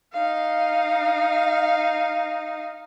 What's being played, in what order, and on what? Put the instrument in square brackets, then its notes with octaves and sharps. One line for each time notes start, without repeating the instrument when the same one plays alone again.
[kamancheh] D#4 F5